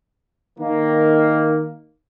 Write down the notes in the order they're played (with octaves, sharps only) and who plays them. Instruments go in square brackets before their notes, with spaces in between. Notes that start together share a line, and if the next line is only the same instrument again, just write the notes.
[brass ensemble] D#3 A#3